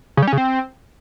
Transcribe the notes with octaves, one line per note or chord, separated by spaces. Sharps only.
C#3
G3
C#4
C#3
C4